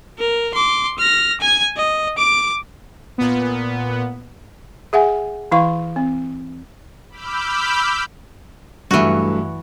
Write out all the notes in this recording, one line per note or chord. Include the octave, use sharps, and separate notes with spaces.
A#4
C6 D6
F6 A#6
G#5 G#6
D#5
D6 D7
A#2 B3
G#4 E5 F#5 G#5
E3 E4 F5 C#6
C4
B5 D6 E6 F6 G6
G2 E3 F#3 A3 F#4